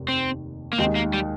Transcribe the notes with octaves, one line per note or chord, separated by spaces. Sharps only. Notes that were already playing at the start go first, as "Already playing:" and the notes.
Already playing: F1 D#2 D#3
C4
A#3
D#2 D#3 G#3 C4 D#4
A#3
G3